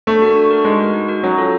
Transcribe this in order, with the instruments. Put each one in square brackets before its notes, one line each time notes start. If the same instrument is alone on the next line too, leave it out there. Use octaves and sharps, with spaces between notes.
[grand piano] A3 [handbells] D4
[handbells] F#4 A#4
D4
F#4 A#4
[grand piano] G#3 [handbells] D#4
[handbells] F#4 A#4
D#4
F#4 A#4
[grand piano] F#3 [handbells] C#4
[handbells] F4 A4